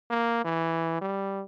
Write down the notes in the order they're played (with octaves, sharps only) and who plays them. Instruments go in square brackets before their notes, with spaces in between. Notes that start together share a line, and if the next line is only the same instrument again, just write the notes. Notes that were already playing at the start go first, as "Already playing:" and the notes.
[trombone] A#3
E3
G3